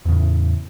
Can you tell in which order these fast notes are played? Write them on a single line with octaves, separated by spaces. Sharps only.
E2 C#3 A2